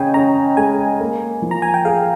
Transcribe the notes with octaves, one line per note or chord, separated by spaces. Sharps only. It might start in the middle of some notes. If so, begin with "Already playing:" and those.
Already playing: C#3 C#4 D#5 G5 G#5
C#4 A#5
G#3 G#5
A#3
F3
A#5
G#5
G5
G#4 F5